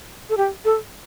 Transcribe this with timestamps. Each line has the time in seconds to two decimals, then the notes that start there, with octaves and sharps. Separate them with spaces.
0.29 A4
0.37 G4
0.65 A4